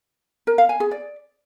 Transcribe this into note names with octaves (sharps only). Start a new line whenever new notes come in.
A#4
F5
G#5
G#4
D5